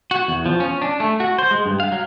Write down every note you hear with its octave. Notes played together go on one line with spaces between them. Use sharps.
F#4
E2
F3
C#4
D4
A3
F#4
C5
G#3
G2
F5
F#3